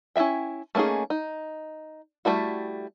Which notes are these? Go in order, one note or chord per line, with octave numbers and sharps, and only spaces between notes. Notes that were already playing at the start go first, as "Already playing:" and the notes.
C#4 E4 G#4 E5 G5
A3 A#3 C#4 D#4 G#4
D#4
G3 A3 E4 F#4